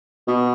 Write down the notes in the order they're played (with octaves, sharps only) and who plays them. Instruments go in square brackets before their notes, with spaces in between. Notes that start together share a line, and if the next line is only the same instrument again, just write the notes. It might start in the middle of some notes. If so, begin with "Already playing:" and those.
[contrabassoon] B2